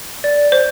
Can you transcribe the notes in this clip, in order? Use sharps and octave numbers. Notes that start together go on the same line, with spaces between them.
D5
C5